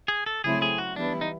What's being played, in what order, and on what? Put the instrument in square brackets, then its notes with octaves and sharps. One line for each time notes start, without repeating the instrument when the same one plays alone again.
[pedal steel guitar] G#4
A4
[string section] C#3 F#3 A3 C4 E4 [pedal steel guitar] G#4
[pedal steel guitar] G#4
F#4
[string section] E3 G3 B3 E4 [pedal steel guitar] D4
[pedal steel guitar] D#4